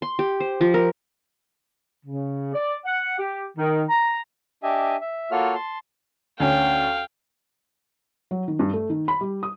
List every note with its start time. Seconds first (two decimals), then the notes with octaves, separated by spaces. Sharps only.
0.02 C6
0.19 G4
0.40 C5
0.61 F3
0.74 A#4
2.06 C#3
2.54 D5
2.85 F#5
3.19 G4
3.57 D#3
3.89 A#5
4.63 D4 G4 D#5 E5 G#5
5.01 E5
5.31 A#3 F4 F#4 A4 C#5 F6
5.54 A5 C6
6.40 D2 C#4 F5 G5
8.31 F#3
8.48 D#3
8.59 G2
8.73 A3
8.90 D#3
9.08 B5
9.21 G3
9.43 D#6